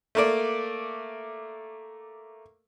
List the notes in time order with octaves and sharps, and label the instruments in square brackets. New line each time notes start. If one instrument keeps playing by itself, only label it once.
[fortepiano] A3 A#3 D5